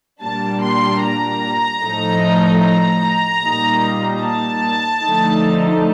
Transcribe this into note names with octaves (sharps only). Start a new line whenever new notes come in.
A#2 G3 A#3 D4 A5
C6
A#5
A2 F3 A3 D#4
A#5
A#2 G3 A#3 D#4
A5
D3 F3 A3 D#4